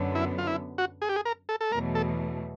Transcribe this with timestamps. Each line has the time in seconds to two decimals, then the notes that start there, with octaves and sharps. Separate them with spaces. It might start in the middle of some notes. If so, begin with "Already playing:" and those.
Already playing: F#2 D3 F#3 B3
0.15 E4
0.38 F4
0.47 E4
0.78 F#4
1.02 G#4
1.09 G4
1.16 G#4
1.25 A#4
1.49 A4
1.61 A4
1.72 E2 B2 F#3 A3 A#4
1.95 A4